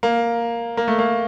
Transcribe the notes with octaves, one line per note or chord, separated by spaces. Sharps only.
A#3
A#3
A3
A#3